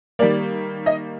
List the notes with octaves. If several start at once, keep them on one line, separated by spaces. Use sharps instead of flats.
D#3 G3 A#3 D5
D#5